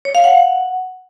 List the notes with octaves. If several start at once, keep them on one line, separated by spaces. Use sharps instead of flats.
C#5
F5
F#5